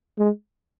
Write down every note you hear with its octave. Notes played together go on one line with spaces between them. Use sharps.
G#3